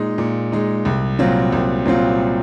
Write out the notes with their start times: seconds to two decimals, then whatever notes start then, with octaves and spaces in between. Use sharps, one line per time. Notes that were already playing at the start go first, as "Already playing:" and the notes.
Already playing: A#2 G#3 D#4
0.18 A#2
0.52 G#3 D#4
0.85 C2
1.19 A#2 F#3 C4 F4
1.52 C2
1.85 A#2 F#3 C4 F4